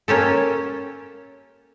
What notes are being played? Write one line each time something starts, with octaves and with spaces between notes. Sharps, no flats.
A#3 C#4 G4 A4